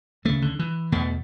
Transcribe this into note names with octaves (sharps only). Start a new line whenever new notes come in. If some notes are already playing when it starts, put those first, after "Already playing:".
D2 C#3 A3
D3
E3
E2 B2 A3